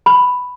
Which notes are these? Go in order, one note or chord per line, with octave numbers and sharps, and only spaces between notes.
B5